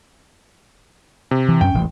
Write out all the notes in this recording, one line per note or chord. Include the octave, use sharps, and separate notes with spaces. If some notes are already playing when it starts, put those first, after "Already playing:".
C3
E3
F#2 C#4 G5
E1 A1